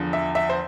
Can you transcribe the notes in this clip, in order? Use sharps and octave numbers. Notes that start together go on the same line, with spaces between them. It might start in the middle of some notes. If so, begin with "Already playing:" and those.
Already playing: E2 D3 F3
E5
E5
C5